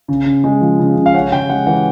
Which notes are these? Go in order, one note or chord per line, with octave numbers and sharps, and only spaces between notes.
C#3
C#3
G#3
F3
C#3
C#3
F5
C#4 F#5
C#3 G5
G#3 F#5
E3 F#5